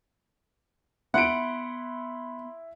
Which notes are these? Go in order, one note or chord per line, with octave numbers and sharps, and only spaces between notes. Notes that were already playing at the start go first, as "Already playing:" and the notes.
B3 E4 F#5 B5 C6 D7